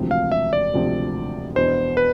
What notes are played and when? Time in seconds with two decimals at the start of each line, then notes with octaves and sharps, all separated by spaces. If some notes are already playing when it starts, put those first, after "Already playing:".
Already playing: E1 D2 C3 F3 C4
0.11 F5
0.32 E5
0.53 D5
0.73 E1 D2 C3 F3 C4
1.55 E2 B2 B3 D4 C5
1.97 B4